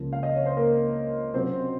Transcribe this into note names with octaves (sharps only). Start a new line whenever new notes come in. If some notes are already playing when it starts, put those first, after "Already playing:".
Already playing: C#2 C#3 F3 A#3
F5
D#5
C#5
C5
A#3 A#4
C3 F#3 C4 C#4 F4 C5